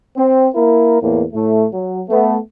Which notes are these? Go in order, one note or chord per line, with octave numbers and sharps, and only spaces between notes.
C4
A#3 E4 A#4
E2 A2 A#3
A2 A3
F#3
A3 B3